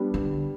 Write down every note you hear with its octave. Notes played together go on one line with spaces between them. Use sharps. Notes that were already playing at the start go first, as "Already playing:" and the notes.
Already playing: G3 B3 D4
D3